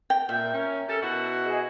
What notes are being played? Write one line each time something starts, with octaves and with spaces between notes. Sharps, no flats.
G5
A#2 E5 G6
C#4 A#4
C#4 G4 A4
B2 E4 F#4
G#4 D#5